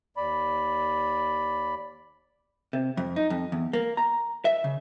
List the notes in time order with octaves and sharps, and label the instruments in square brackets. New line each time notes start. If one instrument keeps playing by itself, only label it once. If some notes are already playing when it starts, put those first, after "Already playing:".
[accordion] D#2 D5 B5
[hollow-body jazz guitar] C3
F2
D#4
F2
E2
A#3
A#5
E5
C#3